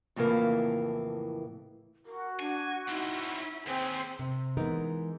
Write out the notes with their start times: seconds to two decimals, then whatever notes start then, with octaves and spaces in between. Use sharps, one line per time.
0.16 F2 A2 C#3 E3 A#3
2.06 F#4 A#4
2.40 D4 G#5
2.89 C4 C#4 D#4 E4
3.66 D#2 C4 G#4 G#5
4.19 C3
4.57 E3 G#3 B3 D#4 A#4